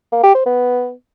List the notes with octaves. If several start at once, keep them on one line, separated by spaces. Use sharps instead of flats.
A#3
G4
C5
B3